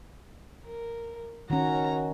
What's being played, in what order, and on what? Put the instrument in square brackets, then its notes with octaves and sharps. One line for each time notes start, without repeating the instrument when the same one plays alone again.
[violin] A#4
[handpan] D#3 C#4 [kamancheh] F#4 [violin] C#5 A#5